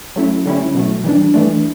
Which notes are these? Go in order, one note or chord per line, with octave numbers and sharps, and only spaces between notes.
F#3 A3 C#4 E4
D3 G3 C#4 E4
B2 F#3 A3
E3 G3 D4
E3 A3 D4